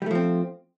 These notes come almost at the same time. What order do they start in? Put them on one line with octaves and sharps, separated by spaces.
G3 A3 F3 C4